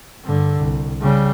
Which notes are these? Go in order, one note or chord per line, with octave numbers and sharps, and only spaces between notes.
G2 D3
C2
C#3 G3